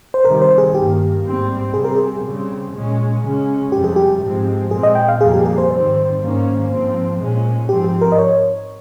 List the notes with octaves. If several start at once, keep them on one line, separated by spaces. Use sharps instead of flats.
C5
C3 D#3 G3 A#4
C5
G#4
G2 D#3 A#3 G4
G#2 G3 C4
C3 G3 C4 G#4
A#4
G#4
C#3 G3 C4
A#2 G#3 C#4
C#3 G#3 C#4
F2 C3 G3 G4
G#4
G4
G#2 F3 G#3 C4
A#2 G#3 C4 G#4
D#5
G5
F5
F2 C3 G3 A#3 G#4
G4
G#4
C5
G#2 D#3 G3 C4 C5
G#2 D#3 A#3 C#4
G#2 F3 C4
A#2 G#3 C#4
G#2 F3 C4 G4
G4
A#4
D#5
C#5